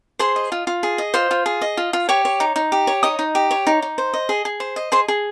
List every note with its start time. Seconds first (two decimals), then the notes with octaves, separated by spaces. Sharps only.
0.19 G#4 C5 C6
0.36 D#5
0.52 F4
0.67 F4
0.83 G#4
0.98 D#5
1.14 F4 C5 C6
1.31 F4
1.46 G#4
1.62 D#5
1.77 F4
1.93 F4
2.09 G4 C#5 C#6
2.25 C#5
2.40 D#4
2.56 D#4
2.72 G4
2.87 C#5
3.03 D#4 D#5 D#6
3.19 D#4
3.35 G4
3.51 C#5
3.67 D#4
3.82 D#4
3.98 C5
4.14 D#5
4.29 G#4
4.45 G#4
4.60 C5
4.76 D#5
4.92 G#4 C5 C6
5.08 G#4